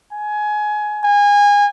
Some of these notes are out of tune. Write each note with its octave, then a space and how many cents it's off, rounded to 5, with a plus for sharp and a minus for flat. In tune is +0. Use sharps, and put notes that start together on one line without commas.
G#5 +20
G#5 -25